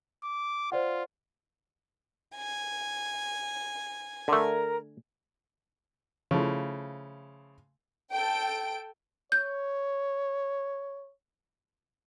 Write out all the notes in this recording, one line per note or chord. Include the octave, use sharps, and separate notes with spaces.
D6
F4 C5 D5 F#5
G#5
D3 A3 A#4
C#3 F3 A3 E4
A4 G5 D7
C#5 G6